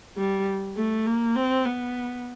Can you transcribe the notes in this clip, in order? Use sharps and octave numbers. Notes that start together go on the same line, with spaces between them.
G3
A3
A#3
C4
B3